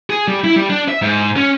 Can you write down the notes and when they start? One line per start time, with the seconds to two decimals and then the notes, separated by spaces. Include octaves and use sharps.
0.10 G#4
0.28 G3
0.44 E4
0.56 G3
0.70 D4
0.88 E5
1.02 G#2
1.37 C#4